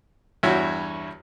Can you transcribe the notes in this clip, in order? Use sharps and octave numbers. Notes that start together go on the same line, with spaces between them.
E2 G2 E4 F#4 C#5